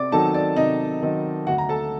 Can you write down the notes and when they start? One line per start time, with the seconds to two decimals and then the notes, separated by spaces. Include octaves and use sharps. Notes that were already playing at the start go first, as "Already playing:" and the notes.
Already playing: C3 D5 D6
0.12 D#3 F#3 C4 D#4 A4 A5
0.34 D5
0.56 C3 D#4 D#5
1.02 D#3 F#3 C4 D#4
1.47 D2 F#4 F#5
1.58 A#5
1.69 A4 A5